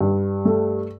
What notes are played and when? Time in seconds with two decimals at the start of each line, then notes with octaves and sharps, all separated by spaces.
0.01 G2
0.45 A3